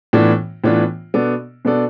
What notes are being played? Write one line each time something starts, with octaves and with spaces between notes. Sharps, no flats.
A2 E3 B3 D4 F4
A2 E3 B3 D4 F4
B2 B3 D4 A4 D5
B2 B3 D4 A4 D5